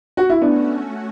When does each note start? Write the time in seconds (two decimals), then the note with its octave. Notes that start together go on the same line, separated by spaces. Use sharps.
0.17 F#4
0.29 E4
0.41 A3 B3 C#4 D4 F#4